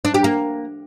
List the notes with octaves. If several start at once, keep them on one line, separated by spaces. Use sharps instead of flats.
D4
G4
A#3